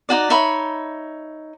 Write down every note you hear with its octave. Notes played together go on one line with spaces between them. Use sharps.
D#4 E4 F#4 D5
D#4 C#5 E5 B5